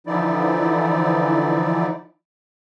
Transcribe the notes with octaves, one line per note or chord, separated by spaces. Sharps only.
D3 E3 F3 D#4 E4 D5